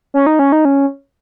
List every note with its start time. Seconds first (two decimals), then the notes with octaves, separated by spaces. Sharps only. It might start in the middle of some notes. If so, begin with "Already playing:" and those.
0.14 C#4
0.26 D#4
0.39 C#4
0.52 D#4
0.65 C#4